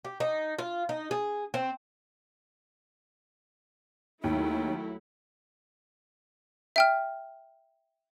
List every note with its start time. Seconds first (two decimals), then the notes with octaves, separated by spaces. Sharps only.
0.05 G4
0.20 D#4
0.59 F4
0.89 D#4
1.11 G#4
1.54 C4
4.24 D#2 F#3 A3 D#4 E4
6.76 E5 G5 F6